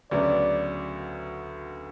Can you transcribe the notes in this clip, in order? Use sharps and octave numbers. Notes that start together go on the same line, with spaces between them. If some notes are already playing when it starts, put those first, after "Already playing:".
D2 C#3 F#3 B3 D5